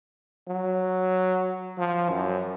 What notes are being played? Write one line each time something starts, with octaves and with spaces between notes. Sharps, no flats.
F#3
F3
F#2